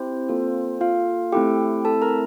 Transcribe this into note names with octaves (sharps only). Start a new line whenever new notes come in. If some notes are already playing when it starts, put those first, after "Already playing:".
Already playing: C4 E4 G4 C5
A#3 F4 A4
F4 F5
A3 C4 E4 G4 A4 G5
A4 A5
A#4 A#5